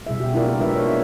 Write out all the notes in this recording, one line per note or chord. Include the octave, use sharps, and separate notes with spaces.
B2 G3 G#4 E5
F#4 G4
D4 E4 F4 G4 A#4 D5
A#3 B3 G4
G#3 D4 F4 G4 B4 E5
C#5